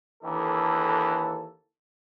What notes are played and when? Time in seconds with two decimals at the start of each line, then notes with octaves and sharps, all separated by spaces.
0.24 D#2 D3 E3 A#3 A4